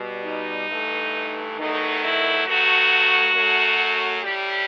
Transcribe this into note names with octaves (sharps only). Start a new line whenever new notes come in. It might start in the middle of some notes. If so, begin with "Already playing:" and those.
Already playing: B2 G3
D#4
G2 E3 A3
E2 D#3 F#3 A3 D#4
E4
G2 F#3 A3 F#4
F#2 F#3 A3
A2 G3 G4